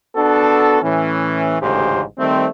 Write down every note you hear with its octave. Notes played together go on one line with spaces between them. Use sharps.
B3 D4 F#4 A4
A2 E3 C#4
A1 D2 G#2 C#3 G4 C5
D#3 G3 A3 C4